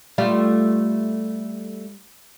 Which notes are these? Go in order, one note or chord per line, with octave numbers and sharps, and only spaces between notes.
G3 A3 F4